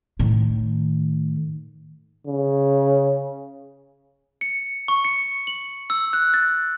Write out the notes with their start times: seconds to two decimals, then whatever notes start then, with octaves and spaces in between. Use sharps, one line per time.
0.19 A2 D#3
2.27 C#3
4.41 C#7
4.88 C#6
5.05 C#7
5.47 F#7
5.90 E6
6.13 F#6
6.34 A6